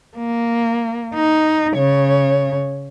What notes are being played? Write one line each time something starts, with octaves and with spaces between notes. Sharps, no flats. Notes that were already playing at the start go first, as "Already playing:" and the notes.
A#3
D#4
C#3 C#5